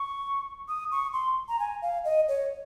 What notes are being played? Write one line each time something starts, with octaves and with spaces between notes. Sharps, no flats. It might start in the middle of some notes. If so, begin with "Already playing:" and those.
Already playing: C#6
D#6
C#6
C6
A#5
G#5
F5
D#5
C#5